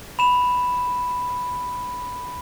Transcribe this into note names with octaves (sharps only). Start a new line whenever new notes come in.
B5 E7